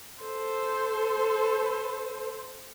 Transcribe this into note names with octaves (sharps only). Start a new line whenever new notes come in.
A4 C5